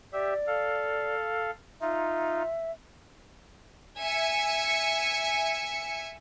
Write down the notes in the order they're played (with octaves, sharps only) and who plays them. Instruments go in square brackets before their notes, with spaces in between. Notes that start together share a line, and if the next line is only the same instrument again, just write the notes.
[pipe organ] G4 E5 [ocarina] D5
[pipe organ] A4 F5
[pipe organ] D#4 F4 [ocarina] E5
[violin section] E5 G#5 C#7